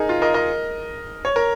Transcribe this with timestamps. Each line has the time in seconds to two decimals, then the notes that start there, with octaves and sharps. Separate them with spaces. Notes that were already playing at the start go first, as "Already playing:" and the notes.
Already playing: D#4 G#4 A#4
0.09 F4
0.22 A#4 D#5
0.34 A#4 D#5
1.25 C#5
1.36 A#4